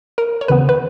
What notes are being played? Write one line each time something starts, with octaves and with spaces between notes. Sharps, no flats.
A#4
C#5
D#2 C#3 E3 B3 B4
B4